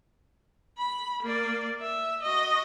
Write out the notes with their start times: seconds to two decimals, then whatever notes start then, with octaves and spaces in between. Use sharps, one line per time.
0.78 B5
1.22 A#3 D5
1.81 E5
2.22 F#4 D#5